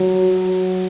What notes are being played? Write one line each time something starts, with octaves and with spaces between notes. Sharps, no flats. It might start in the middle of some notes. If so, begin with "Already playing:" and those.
Already playing: F#3